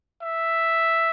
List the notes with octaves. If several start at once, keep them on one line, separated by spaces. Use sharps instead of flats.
E5